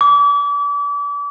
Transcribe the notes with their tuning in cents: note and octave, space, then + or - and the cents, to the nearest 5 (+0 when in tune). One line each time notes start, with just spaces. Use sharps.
D6 -35